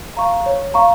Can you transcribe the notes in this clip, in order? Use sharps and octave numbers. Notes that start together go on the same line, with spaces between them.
F5 A#5 C#6
C#5
F5 A#5 C#6